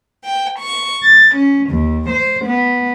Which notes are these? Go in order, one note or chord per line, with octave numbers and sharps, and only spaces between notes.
G5
C#6
A6
C#4
D#2
C5
B3